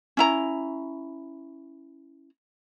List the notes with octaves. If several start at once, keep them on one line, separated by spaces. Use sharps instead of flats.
C#4 E4 A#5